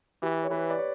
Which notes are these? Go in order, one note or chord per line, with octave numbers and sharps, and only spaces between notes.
E3 G4
C#5
E3 B4
D5
C#5